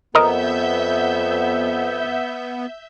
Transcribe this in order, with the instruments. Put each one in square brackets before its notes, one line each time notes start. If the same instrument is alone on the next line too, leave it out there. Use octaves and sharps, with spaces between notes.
[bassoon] F2 [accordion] B3 [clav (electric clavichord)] A#4 D#5 [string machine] E5 G6